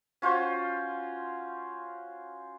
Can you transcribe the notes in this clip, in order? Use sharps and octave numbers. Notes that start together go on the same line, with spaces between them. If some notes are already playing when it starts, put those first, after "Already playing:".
C#4 F4 F#4 C5